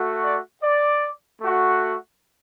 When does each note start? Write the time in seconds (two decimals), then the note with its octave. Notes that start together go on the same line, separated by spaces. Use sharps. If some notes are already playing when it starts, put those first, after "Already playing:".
Already playing: A3 F#4
0.24 D5
0.62 D5
1.41 A3 F#4